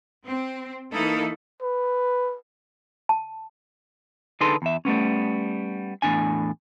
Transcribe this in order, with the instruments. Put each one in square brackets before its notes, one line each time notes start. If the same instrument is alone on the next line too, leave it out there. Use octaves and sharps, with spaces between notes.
[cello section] C4
E3 A#3 D#4 E4 A4
[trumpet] B4
[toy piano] A5
[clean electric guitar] D3 D#4 G#4 A4 B4 C6
E2 E5
G3 A3 B3 C#4
E2 A2 C3 D4 G#5